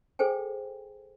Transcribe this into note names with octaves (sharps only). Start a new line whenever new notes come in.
G#4 A4 C5 G5 G#5